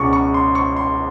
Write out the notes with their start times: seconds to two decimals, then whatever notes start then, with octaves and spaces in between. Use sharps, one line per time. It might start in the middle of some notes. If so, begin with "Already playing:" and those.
Already playing: C#2 B2 G#3 C#4 C#6 D6
0.13 C#6
0.34 C6
0.55 C#6
0.76 C6